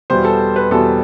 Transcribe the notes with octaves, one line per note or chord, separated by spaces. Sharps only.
E2 B2 G3 B3 C5
A4
B4
E2 B2 G3 B3 A4